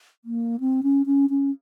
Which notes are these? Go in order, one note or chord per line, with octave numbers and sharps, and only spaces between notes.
A#3
C4
C#4
C#4
C#4